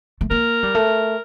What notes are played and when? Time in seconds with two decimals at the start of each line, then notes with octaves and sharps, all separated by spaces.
0.21 A3
0.31 A#3 A#4
0.63 G3
0.75 A3